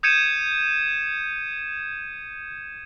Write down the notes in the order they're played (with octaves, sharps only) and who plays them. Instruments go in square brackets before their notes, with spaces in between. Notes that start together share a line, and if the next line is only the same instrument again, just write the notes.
[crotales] D#6 G6 G#6 C#7 D#7 E7